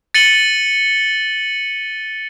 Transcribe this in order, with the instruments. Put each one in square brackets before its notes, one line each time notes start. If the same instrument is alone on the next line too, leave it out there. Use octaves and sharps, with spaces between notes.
[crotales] A6 C#7 D#7 F#7 G7